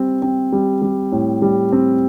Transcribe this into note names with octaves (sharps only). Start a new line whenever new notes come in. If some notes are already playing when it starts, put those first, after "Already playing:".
Already playing: G3 C4
C4
G3
G3
A2
G3
C4